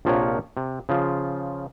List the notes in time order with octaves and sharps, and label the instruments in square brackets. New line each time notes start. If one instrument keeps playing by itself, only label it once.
[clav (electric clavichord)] A#1 C3 F3 A#4 C#5 F#5
C3
C#3 F3 F4